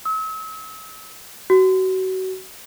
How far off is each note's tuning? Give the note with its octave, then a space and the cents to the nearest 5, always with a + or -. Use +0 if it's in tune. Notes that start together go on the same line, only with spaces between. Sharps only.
E6 -40
F#4 +25